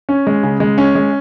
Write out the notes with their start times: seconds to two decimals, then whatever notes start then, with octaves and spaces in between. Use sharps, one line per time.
0.09 C#4
0.27 G#3
0.43 C#3
0.60 G#3
0.78 C#4
0.95 G#3